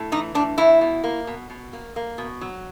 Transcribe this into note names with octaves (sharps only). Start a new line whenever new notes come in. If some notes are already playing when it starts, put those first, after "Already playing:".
Already playing: A2
E3 D#4
A2 D4
A2 E4
B2
A#3
B2
B2
A#3
A#3
B2
F#3